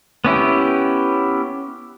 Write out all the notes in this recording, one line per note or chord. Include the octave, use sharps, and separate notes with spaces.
B3 C#4 E4 G4